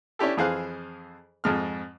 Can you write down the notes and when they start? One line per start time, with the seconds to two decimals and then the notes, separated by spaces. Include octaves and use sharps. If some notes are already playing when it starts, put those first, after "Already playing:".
0.19 C#4 D4 E4 G4 A4
0.37 F2 E3 G#4 C5 F5 F#6
1.44 F2 G#2 F6